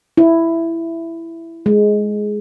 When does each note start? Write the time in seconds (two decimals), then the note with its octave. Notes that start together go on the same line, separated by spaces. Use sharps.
0.17 E4
1.66 G#3